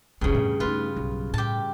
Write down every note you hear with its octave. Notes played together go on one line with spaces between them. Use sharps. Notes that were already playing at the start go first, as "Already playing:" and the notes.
F1 C2 G2 C#3
F2 A2
A3 D#4 F4 B4
B1 F#3
A2 G4 A5